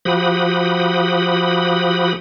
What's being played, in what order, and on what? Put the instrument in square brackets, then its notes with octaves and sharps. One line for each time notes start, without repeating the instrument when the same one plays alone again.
[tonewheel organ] F3 F#4 G4 B5 D#6